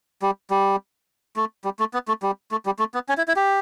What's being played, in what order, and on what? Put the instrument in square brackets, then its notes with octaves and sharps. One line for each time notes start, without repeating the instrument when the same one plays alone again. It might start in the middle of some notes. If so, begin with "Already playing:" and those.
[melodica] G3
G3
A3
G3
A3
B3
A3
G3
A3
G3
A3
B3
C#4
E4
E4
G4